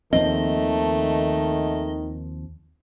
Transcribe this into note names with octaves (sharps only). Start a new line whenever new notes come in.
D#2 D#3 F3 A3 C4 D#5